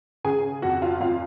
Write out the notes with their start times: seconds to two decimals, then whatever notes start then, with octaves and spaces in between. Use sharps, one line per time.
0.24 C#3 G#4 G#5
0.62 F2 F#4 F#5
0.82 F4 F5
1.01 F2 F4 F5